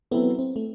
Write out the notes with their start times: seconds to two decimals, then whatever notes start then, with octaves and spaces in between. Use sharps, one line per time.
0.11 F#3 B3 C4 E4 A4
0.39 C4
0.56 A3